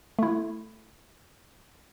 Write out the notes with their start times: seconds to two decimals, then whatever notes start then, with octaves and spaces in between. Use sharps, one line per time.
0.19 A3 E4